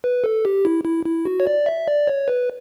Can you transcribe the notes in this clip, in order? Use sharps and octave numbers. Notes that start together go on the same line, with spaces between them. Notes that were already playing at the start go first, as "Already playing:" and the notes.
B4
A4
G4
E4
E4
E4
F#4
C#5
D5
E5
D5
C#5
B4